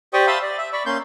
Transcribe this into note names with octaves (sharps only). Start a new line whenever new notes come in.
G4 C5 D5 G5 C#6 D#6
E5 F5 A5 B5 C6 D#6
D5
E5
D5 B5 C#6
A#3 C#4 C6 G6